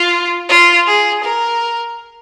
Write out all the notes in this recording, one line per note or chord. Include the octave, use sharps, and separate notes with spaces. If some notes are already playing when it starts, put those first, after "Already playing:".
Already playing: F4
F4
G#4
A#4